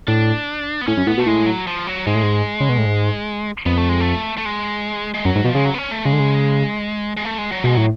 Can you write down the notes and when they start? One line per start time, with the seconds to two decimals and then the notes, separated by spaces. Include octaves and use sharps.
0.07 A2 D4
0.81 B3
0.87 A2 C#4
0.97 F#2
1.07 A2 B3
1.18 B2 A3
1.26 A2 G#3
1.46 F#3
1.67 F3
1.87 F#3
2.07 G#2 G#3
2.15 A2
2.23 G#2
2.60 C#3
2.69 B2
2.78 A2
2.86 G#2
3.66 F2 B3
3.77 A3
3.89 G#3
4.00 A3
4.38 A3
4.45 G#3
5.14 G#3
5.25 F#2 F#3
5.36 G#2
5.45 B2 F3
5.55 C#3 G#3
5.65 F#3
5.74 B3
5.78 C#4
5.91 A3
6.05 C#3 G#3
6.13 D3
6.20 C#3
7.17 G#3
7.25 A3
7.38 G#3
7.52 F#3
7.64 B2 G#3
7.75 A2 F#3